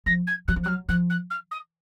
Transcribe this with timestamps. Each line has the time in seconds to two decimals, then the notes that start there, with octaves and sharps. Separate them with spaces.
0.06 F3 A#6
0.27 G#6
0.48 F#3 F#6
0.56 F3
0.64 F#3 F6 F#6
0.89 F3 F#6
1.10 F#6
1.30 F6
1.51 D#6